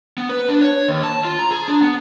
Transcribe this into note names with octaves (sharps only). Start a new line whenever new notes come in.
B3
B4
D4
C#5
D#2
A5
F4
A#5
G#4
D4
B3